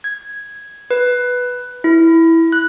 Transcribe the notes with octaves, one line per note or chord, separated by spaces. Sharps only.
G#6
B4
E4
F#6